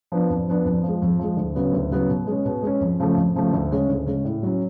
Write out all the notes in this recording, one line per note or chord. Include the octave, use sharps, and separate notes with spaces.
F3 B3 D4
F2
F3 B3 D4
F2
F3 G#3
F2
F3 G#3
D2
C#3 F#3 B3
D2
C#3 F#3 B3
B2
G#3 C#4
B2
G#3 C#4
F2
C#3 F3 A3
F2
C#3 F3 A3
D2
C#3 G#3 C#4
D2
C#3 G#3 C#4
A2
F#3 C#4